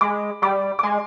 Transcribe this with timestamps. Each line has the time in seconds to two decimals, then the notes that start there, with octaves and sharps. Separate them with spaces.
0.01 G#3 B5 D6
0.42 G3 B5 D6
0.79 D6
0.83 G#3 G#5 C6